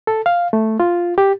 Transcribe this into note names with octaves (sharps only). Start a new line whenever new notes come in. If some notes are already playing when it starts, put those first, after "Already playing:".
A4
F5
A3
F4
G4